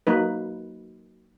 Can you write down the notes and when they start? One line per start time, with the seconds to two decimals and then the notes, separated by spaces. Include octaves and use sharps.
0.07 F#3 A#3 D#4 B4